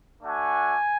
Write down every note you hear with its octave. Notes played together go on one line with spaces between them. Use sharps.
A3 D4 F#4 G#5